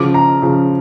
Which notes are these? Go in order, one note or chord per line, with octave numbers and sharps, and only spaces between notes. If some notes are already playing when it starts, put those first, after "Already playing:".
Already playing: C#3 F3 D6
A#5
C#3 F3